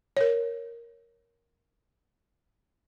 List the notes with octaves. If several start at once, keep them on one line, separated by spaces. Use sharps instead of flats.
A#4 C#5